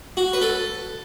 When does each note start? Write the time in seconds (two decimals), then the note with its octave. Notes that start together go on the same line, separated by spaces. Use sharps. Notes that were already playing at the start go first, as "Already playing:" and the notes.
0.17 F#4
0.33 B4
0.42 A4